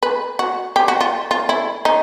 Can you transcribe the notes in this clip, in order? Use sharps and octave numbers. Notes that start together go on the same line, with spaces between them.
B4
F#4
G4
F#4
F4
F4
E4
D#4